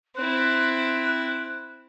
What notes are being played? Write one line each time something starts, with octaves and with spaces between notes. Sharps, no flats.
C4 E4 F#6